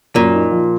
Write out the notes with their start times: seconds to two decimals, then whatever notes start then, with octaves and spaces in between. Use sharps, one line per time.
0.16 F#2 A#2
0.34 D#4
0.51 F3